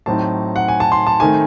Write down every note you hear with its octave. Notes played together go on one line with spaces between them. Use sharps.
A2 F#3 C4 D#4 A5
F#5
G#5
A5
C6
A5
D#3 A3 C4 D#4 G#5